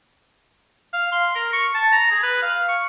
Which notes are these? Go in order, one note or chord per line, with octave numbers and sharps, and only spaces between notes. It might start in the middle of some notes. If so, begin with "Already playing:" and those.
F5
C6
A#4
C#6
A5
A#5
G#4
B4
F5
C#6